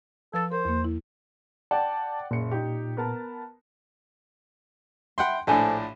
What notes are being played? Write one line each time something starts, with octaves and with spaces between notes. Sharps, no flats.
F3 A4 B4 A6
A#4 C5
E2 A#3
E4
D5 F#5 G5 A5
F#1 A#2 C#7
D#4 G4
B3 A#4 A5
E5 F#5 G5 B5 C6
A#1 A2 D4 A4 C5 G#5